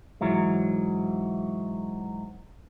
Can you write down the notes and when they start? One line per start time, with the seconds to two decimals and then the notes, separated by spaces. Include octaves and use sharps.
0.21 G#2 E3 F#3